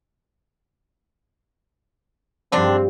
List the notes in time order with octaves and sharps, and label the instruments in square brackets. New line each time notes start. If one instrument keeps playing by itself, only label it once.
[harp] G2 F3 G3 [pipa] D3 D#3 D4 [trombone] C4